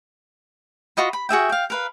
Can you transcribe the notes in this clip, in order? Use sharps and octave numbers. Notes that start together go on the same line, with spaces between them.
F4 F#4 D#5 B5
B5
F#4 G#4 E5 G5
F5 G5
A#4 B4 F5